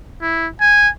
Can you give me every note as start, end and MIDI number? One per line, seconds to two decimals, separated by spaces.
0.22 0.48 64
0.61 0.89 80